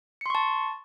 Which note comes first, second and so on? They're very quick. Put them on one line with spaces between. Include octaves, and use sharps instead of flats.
C#7 C6 C#6 A5